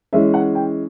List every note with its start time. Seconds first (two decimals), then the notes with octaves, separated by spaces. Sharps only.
0.13 E3 G#3 C#4 E5
0.34 F#5
0.55 G5